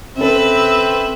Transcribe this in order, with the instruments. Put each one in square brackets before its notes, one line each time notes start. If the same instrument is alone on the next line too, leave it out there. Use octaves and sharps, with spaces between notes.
[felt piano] C#3 A4 [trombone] C4 [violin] B4 E5